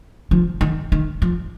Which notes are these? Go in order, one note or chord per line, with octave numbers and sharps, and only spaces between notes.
F3
D#3
D#3
F3